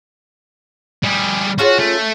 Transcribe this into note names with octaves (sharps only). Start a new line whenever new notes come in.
G3 G#4
C#4 F4 F#4 G#4
A3